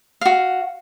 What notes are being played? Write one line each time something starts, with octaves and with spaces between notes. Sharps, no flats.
F#4 F5